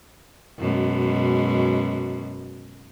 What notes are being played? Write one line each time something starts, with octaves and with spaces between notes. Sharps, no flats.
F#2 B2 G#3